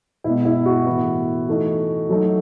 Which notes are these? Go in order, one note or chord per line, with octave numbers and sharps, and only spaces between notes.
B2 G#3 B3 E4
E4
F#4
A2 E3 B3
E3 A3 D#4
F#3 A3 D#4